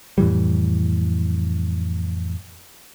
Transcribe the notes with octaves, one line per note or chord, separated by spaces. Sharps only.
F2 A2 E3 G3